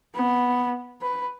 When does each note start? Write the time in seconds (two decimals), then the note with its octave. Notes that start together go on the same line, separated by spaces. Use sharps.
0.15 B3
1.02 B4